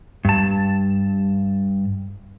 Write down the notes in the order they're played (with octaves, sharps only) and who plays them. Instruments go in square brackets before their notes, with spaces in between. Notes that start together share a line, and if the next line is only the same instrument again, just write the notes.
[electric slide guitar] G2 A5